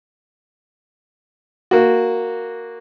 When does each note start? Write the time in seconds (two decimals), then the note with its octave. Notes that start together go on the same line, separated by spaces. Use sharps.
1.71 A#3 F#4